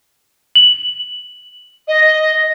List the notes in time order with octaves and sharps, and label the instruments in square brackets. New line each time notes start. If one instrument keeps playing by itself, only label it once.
[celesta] F#7
[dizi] D#5